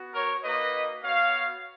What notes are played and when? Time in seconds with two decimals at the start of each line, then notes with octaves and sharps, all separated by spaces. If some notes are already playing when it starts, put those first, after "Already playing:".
Already playing: B3 F#4
0.14 A#4 C#5
0.43 A#3 D#4 F#4 B4 D#5
1.03 B3 F#4 C#5 F5